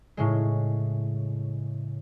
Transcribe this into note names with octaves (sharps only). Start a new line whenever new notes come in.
A2 C#3 G#3